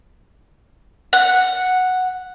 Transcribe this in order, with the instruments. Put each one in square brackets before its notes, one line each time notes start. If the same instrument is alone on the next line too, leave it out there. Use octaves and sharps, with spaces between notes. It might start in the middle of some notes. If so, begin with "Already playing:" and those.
[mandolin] F#5